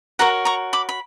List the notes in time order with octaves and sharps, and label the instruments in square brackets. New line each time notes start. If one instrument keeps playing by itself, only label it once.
[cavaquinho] F#4 A#4 C#5 F#5 A#5
A#5 C#6
B5 D6
B5